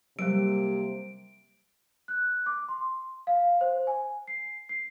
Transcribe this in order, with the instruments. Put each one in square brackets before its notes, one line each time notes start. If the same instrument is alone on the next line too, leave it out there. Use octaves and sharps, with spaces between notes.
[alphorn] C3 [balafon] F#3 G3 [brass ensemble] A#3 [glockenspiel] D7
[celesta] F#6
D6
C6
F5
C5
G#5
C7
C7